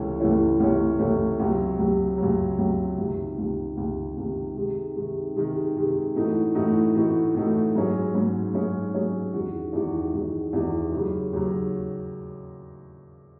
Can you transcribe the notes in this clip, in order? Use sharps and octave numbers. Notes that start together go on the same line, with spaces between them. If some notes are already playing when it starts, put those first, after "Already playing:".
Already playing: C#2 C3 E3 A3 C#4
C#2 C3 E3 A3 C#4
C#2 C3 E3 A3 C#4
C#2 C3 E3 A3 C#4
C#2 C3 F#3
C#2 C3 F#3
C#2 C3 F#3
C#2 C3 F#3
C#2 C3 D#3
C#2 C3 D#3
C#2 C3 D#3
C#2 C3 D#3
C3 D#3 G#3
C3 D#3 G#3
C3 D#3 G#3
C3 D#3 G#3
A2 E3 A3 D#4 F#4
A2 E3 A3 D#4 F#4
A2 E3 A3 D#4 F#4
A2 E3 A3 D#4 F#4
G#2 F#3 C#4 G#4
G#2 F#3 C#4 G#4
G#2 F#3 C#4 G#4
G#2 F#3 C#4 G#4
E2 D#3 G#3 D#4 F#4
E2 D#3 G#3 D#4 F#4
E2 D#3 G#3 D#4 F#4
E2 D#3 G#3 D#4 F#4
D#2 C#3 F#3
D#2 C#3 F#3